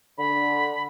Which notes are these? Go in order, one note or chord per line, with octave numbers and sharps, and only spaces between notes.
D3 B5